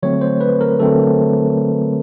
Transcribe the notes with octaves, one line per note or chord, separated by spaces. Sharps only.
D3 F#3 A3 C4 C#5
C5
B4
A#4
D3 F#3 A3 C4 A4